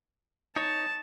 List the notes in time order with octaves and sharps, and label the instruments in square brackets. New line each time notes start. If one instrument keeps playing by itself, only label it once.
[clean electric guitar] D#4 C#5 [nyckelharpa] A5